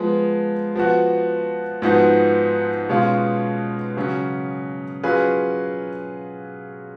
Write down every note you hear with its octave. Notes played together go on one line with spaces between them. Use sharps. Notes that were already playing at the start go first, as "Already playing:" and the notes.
Already playing: F3 G#3 B3
F3 B3 F#4
G#2 F3 B3 D#4 F#4
B2 G#3 C#4 F4
C#3 F#3 C#4
F#3 C#4 F4 G#4 B4